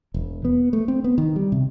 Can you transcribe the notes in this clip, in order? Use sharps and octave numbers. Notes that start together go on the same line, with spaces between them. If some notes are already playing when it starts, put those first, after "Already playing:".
E1
B3
A3
C4
B3
D#3
G3
C3